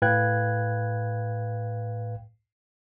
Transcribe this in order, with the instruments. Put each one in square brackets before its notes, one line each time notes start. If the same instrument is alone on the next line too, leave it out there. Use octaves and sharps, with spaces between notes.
[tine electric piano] A2 B4 F5 G5 F#6 G#6